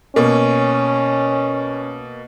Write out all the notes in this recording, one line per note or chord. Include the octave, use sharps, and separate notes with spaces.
B2 A#3 C#4